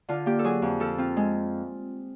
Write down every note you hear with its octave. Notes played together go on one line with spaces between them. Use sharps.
D3 F4
A#3 G4
A4
F#3 G#4
F2
F3 A4
C4 F4
G#3